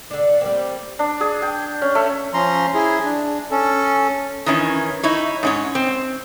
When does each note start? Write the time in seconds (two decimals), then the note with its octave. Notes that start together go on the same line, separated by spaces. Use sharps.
0.10 D3 D4
0.41 G3 A#3 C4
0.99 D4
1.21 G#4
1.42 G5
1.82 C#4
1.95 A3
2.34 F3 C#4 A#5 C6
2.74 E4 G#4
3.04 D4
3.51 C#4 A4
4.46 D#3 E3 C#4
5.03 D#4 E4 C#5
5.43 G#2 C#4 C#5
5.75 C4